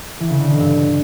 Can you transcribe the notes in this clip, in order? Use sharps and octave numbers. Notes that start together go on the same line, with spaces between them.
E3
C#3
D3
B2
G2